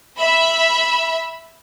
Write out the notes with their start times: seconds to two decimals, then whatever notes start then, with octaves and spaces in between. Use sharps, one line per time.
0.18 E5 B5